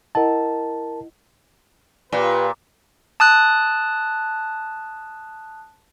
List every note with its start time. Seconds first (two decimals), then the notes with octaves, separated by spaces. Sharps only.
0.15 E4 A#4 D#5 F#5 A5
2.13 A#2 F4 G4 B4
3.20 A5 D#6 F#6